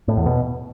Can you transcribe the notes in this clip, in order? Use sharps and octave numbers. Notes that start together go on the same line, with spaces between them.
A2
E2
B2